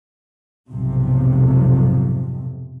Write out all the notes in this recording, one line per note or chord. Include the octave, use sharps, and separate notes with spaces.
B1 F2 G#2 C3